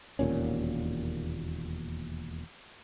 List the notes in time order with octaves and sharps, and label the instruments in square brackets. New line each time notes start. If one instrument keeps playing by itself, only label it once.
[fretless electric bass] E1 D#2 A#2 C#4